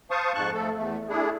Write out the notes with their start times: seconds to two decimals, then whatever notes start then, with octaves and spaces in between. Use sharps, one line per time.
0.11 C5 F5 A5 C#6 D#6
0.34 F2 G#2 A5 C#6 F#6
0.53 F3 A3 A4
0.76 E2 A3
1.09 A3 D4 E4 G#4